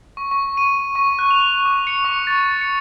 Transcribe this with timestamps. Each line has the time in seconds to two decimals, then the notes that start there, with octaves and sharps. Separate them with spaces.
0.17 C#6
0.31 C#6
0.57 D#7
0.95 C#6
1.19 F#6
1.30 F7
1.65 D6
1.87 C#7
2.04 C#6
2.27 A6
2.61 C#7